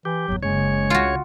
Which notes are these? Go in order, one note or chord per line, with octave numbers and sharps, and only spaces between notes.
E3 G4
G1 E2 F#3
F#1 C#3 G#3 C#5
C#2 F4 F#4